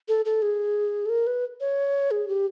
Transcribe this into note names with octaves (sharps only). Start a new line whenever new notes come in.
A4
A4
G#4
A4
A#4
B4
C#5
G#4
G4